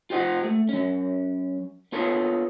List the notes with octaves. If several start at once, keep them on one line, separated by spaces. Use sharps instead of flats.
F4 G4 C5 D#5 F#5
A3
F#3 C#4
B3 F4 A4 C#5